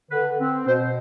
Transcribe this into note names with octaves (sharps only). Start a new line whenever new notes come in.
D3 B4
C4
B2 C5